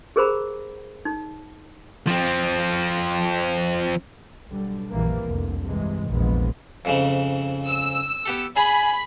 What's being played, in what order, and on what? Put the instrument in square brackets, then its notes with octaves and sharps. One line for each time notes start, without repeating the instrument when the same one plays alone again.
[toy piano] G4 G#4 A#4 C5 A#5 B5
D#4
[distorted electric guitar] F3 C4
[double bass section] B1 D3 G3
A#1 F#2 E3 G3 A#3
F1 C2 D3
G2 C3 E3 G#3
F1 A#1 E2 F3 G#3 B3
[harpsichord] F2 G#2 C#3
[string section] E6
[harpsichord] B3 G4 A4
[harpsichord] G#4 [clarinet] G#5 [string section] B5